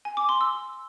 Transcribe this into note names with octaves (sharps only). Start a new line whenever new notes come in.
G#5
D6
C6
E6